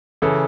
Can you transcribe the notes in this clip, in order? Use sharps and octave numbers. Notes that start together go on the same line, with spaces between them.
C#3 E3 A4